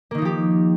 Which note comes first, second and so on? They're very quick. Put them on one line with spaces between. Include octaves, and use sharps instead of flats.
A#3 D#3 D#4 F3 G4